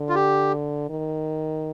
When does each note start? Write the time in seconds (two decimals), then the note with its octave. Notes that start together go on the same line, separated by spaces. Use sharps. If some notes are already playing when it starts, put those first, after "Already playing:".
Already playing: D3
0.09 F4
0.15 G4
0.90 D#3